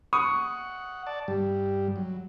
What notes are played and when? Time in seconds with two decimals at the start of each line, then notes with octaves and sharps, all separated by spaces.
0.13 F#5 C#6 D#6
1.07 D5 A5
1.28 G2 G3
1.96 F#3